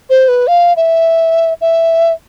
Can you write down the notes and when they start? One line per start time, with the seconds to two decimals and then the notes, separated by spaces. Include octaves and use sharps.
0.10 C5
0.28 B4
0.47 F5
0.76 E5
1.61 E5